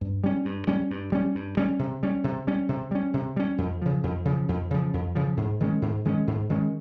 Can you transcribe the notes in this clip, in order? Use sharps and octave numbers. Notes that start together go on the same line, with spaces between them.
G2
G3 C#4
G2
G3 C#4
G2
G3 C#4
G2
G3 C#4
C3
G3 C#4
C3
G3 C#4
C3
G3 C#4
C3
G3 C#4
F2
C#3 F3
F2
C#3 F3
F2
C#3 F3
F2
C#3 F3
G#2
D#3 G#3 C#4
G#2
D#3 G#3 C#4
G#2
D#3 G#3 C#4